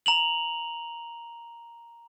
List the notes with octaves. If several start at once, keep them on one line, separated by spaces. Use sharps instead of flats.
A#5 F7 F#7